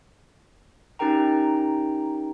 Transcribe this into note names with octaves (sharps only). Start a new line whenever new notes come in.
C#4 D#4 G4 A#4 G5 A#5